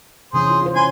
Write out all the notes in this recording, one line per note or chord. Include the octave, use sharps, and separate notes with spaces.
C3 E3 C#4 G#4 C5
F4
F4 C5
C#4 B4 G#5 C6